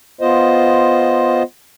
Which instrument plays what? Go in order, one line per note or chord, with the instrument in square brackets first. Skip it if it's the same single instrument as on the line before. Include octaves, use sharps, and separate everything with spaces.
[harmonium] B3 F4 C5 D#5